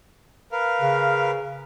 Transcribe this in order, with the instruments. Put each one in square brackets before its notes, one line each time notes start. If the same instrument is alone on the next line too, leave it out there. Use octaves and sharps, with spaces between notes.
[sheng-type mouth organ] A#4 B4 F5
[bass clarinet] C#3